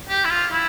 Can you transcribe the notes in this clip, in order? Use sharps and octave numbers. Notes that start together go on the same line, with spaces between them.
G4
E4
F4
E4